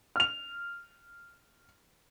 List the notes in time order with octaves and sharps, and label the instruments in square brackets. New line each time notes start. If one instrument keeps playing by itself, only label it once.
[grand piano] F6 F7